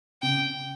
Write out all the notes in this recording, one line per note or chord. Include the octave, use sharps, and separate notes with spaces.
C#3 G5